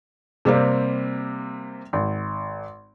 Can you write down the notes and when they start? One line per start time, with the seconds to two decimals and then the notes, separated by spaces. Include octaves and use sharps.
0.45 C3 G3 A#3 C4
1.93 G#1